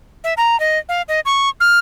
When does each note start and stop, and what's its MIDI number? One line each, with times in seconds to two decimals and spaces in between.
0.24 0.34 76
0.37 0.58 82
0.60 0.78 75
0.89 1.02 77
1.08 1.20 75
1.25 1.49 85
1.61 1.79 89